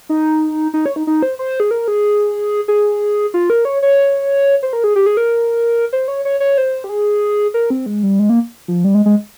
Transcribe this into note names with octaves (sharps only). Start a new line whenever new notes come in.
D#4
D#4
C#5
D#4
D#4
C5
C5
G#4
A#4
G#4
G#4
F4
A#4
C#5
C#5
C5
A#4
G#4
G4
G#4
A#4
C5
C#5
C#5
C#5
C5
G4
G#4
A#4
C4
G#3
G3
G#3
A#3
F3
G3
G#3
G#3